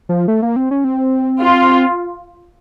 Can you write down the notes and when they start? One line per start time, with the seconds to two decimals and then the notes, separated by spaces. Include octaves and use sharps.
0.09 F3
0.28 A3
0.42 A#3
0.56 C4
0.71 C#4
0.84 C4
1.40 F4